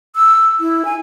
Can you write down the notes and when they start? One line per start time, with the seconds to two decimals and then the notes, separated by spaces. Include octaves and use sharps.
0.15 E6
0.60 E4
0.85 G#5